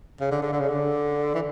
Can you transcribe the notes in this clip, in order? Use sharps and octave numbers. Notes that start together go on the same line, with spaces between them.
C#3
D3
D3
D3
C#3
D3
E3